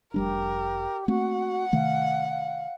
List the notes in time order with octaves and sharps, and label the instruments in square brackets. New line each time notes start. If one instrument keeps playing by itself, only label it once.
[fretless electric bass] F1 G3 D4 [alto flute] G4 [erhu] A#4
[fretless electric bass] A3 A#3 C4 [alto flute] F#4 [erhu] F#5
[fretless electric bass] C3 D#3 A3 [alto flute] F5
[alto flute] F5